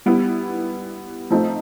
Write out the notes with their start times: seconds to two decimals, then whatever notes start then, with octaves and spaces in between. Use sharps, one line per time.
0.06 G3 B3 E4
1.30 F3 A3 C4 D#4